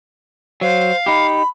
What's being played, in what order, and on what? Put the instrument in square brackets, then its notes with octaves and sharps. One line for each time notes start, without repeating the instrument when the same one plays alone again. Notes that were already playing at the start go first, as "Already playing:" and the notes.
[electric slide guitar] F#3 [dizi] C5 [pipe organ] F5
[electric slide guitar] D#4 G4 [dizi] B5